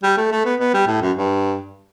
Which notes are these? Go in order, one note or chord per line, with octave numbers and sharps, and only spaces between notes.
G3
A3
A3
B3
B3
G3
A2
F#2
G2